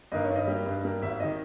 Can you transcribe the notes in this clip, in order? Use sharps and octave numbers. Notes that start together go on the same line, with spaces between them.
G2 D#3 A#3 D#5
C#5
G2
D#5
G3 A#3
G2
G3 A#3
G#1 E5
D#5
D#3